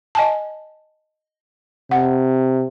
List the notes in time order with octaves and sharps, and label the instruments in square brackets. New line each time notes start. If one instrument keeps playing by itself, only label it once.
[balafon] D#5 G#5 A5
[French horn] C3 [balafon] F#5